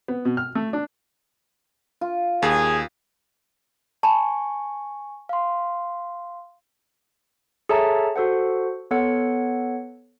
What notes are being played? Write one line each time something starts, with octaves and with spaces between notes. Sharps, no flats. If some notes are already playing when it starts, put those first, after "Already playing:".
B3
B2
F6
A3
D4
F4
D#2 G#4
G#5 A5 B5 C#6
F5 C6
G#4 A4 C#5 E5 A5 A#5
F#4 A4 C5 F#5
B3 A4 C#5 F#5